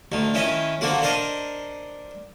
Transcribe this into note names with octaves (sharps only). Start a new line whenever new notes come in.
D2 D#3
D#3 C#4 E4 D#5
D3 A#3 C4 F#4
D4 A#4 C5 D#5 C#6